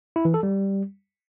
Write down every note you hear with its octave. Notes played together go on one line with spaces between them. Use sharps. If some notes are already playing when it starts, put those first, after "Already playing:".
E4
E3
A4
G3